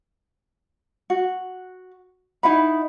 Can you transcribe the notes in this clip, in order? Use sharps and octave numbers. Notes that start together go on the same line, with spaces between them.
F#4
D#4 E4 F#5 B5